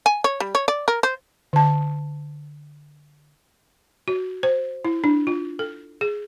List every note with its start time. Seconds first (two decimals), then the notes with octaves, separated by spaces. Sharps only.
0.06 G#5
0.24 C#5
0.40 G3
0.55 C#5
0.68 D5
0.88 A#4
1.03 C5
1.53 D3 A5
4.08 F#4
4.43 C5
4.85 E4
5.04 D4
5.27 F4
5.59 A4
6.01 G#4